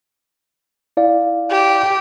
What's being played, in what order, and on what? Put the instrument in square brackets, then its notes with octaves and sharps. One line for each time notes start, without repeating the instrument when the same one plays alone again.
[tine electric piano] E4 D5 F5
[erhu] G4